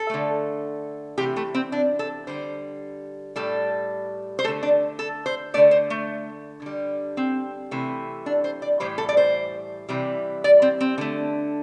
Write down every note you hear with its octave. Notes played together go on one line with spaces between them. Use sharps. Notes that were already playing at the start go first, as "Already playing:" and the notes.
Already playing: A4
D3 A3
C3 E3 A3 G4
A3
C4
D4
A4
D3 G3 C5
A2 G3 A4
C5
D3 A3 A4
D4
A4
C5
D3 A3 D5
C5
A3
D3 G3
C4
C3 E3 A3
D4
C5
D5
A2 E3 G3 C5
A4
D5
C5
C3 E3 G3
D5
C4
C4
D3 A3